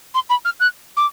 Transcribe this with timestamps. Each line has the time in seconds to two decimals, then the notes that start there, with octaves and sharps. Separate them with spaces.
0.15 C6
0.30 B5
0.45 F6
0.60 F#6
0.97 D6